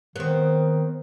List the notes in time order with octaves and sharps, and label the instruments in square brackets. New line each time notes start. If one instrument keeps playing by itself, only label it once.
[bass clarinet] D#3 [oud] B3 C4